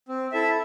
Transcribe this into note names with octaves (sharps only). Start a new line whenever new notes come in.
C4
E4 A4 E5